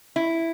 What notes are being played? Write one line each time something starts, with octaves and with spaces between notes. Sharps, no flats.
E4